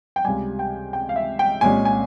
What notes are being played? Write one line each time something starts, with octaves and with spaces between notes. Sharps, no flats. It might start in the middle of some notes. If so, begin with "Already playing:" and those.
G5
C#2 C3 G3 G#5
G5
G5
F5
E5
G5
C2 A#2 G#3 C#4 G#5
G#5